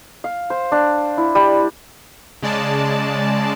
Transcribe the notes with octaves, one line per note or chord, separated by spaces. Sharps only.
F5
C5
D4
E4
G3
C#3 G#3 D5 A5